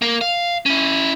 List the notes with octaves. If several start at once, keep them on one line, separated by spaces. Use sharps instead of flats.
A#3 A#4
F5
C#4 E4